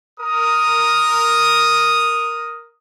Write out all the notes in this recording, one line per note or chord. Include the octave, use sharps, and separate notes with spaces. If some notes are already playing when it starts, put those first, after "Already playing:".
A#4 D#6